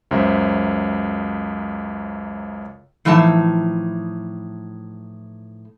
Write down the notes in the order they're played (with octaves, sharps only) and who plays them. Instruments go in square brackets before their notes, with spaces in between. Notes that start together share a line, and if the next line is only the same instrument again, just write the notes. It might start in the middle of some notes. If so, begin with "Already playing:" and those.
[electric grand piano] C#2 F#2 C5 E5
[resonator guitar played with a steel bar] A2 E3 F3 D#4 E5 A5